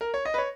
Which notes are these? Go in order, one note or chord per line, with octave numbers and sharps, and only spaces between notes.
A#4
C#5
D#5
B4
C#5